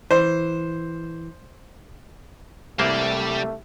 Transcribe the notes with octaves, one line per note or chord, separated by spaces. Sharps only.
E3 C5
C2 E3 G3 A3 A#3 C5 D5